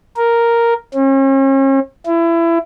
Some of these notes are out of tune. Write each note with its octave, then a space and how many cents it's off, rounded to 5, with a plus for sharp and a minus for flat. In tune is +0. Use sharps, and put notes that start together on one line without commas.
A#4 +0
C#4 -40
E4 +25